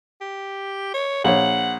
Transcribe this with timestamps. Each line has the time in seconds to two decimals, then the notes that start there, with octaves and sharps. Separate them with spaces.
0.21 G4
0.94 C#5
1.24 A#1 C#5 F#5